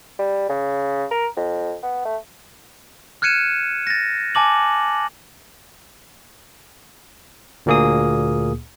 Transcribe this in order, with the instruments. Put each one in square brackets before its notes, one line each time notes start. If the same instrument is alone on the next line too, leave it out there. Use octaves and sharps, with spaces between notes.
[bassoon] G3
C#3
A#4
F2
B3
A3
[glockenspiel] F6 F#6 G#6 C#7 D#7 E7
A6 A#6
G#5 A5 D6 F#7
[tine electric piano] D2 A#2 A#3 G#4 D#6